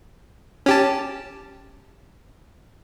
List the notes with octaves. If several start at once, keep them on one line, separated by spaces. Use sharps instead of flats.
C#4 G4 A5